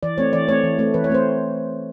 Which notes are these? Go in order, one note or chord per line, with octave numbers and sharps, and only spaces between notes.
E3 D5
A3 C4 C#5
E3 D5
A3 C4 C#5
E3
A3 C4
E3 B4
C#5
A3 C4 C5